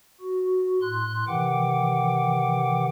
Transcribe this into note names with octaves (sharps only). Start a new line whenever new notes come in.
F#4
A2 C6 F#6
C3 D#3 E3 F#5 G5 D6